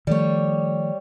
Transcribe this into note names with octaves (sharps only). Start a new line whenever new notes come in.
D#3 F3 G3 A3 C#5